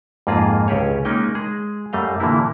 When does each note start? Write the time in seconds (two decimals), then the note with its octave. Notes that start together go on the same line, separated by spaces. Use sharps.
0.27 F2 G#2 A#3 F4 G#4
0.68 C#2 C#4 G4 G#4 C#5
1.05 G#3 A#3 C#4 D#4 D#5 G5
1.35 G#3 G#4
1.93 F#2 G3 A3 D#5 F5
2.20 A#2 D3 E3 G3 A#3 E4